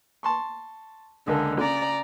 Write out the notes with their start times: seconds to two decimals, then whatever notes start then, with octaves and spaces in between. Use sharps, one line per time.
0.23 A5 C6 C#6
1.27 C#2 D3 A#3 A4
1.61 C#3 D5 A#5